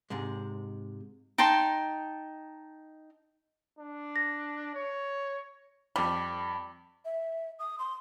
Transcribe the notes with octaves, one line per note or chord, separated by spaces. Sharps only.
G#2 C3 G#3
D#4 G5 A5 C6
D4
A#6
C#5
F2 G3 B5
E5
D#6
C6